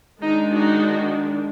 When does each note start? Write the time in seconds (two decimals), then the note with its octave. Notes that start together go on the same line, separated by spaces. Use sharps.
0.21 D#3 G#3 D4 D#4
0.50 D#4 F#4